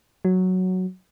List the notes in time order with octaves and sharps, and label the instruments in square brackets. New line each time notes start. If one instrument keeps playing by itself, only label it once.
[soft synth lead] F#3